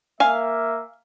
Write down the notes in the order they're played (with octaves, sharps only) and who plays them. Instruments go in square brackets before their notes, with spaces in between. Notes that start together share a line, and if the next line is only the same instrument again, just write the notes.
[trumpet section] A#3 E5 [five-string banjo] F5 G#5